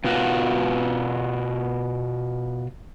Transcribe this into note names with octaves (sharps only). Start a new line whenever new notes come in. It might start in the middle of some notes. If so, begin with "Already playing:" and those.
B2 F4 F#4